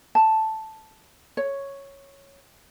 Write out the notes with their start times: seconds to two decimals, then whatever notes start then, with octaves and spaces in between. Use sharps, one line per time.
0.15 A5
1.37 C#5